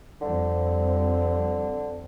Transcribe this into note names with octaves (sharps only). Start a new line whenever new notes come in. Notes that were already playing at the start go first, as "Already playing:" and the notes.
F2 D3 G3 C4